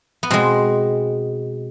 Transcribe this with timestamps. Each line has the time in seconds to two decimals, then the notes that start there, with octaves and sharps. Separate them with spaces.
0.23 B3
0.30 B2 G#3 C4